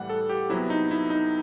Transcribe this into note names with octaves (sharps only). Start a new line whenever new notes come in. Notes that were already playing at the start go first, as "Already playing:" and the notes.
Already playing: A2 E3 G3 F#5
A4
G4
C3 F#3 B3 E4
D#4
E4
D#4